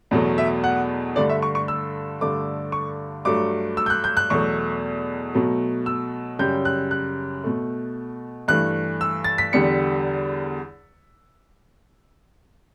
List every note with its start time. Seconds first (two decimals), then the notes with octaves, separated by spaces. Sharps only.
0.11 E2 B2 F#3 A3
0.38 E5
0.64 F#5
1.16 G2 D3 A3 D5
1.29 E5
1.42 C#6
1.55 C#6
1.68 E6
2.21 G2 D3 A3 D6
2.72 C#6
3.25 G2 F#3 A3 D6
3.77 E6
3.86 G6
3.90 F#6
4.04 G6
4.17 F#6
4.30 E2 B2 F#3 A3 C#6
5.34 B2 F#3 A3
5.86 E6
6.39 F#2 C#3 G3 G6
6.65 F#6
6.91 F#6
7.44 B2 A3
8.48 G2 E3 A3 F#6
9.01 E6
9.24 A6
9.38 B6
9.53 E2 D3 G3 C#7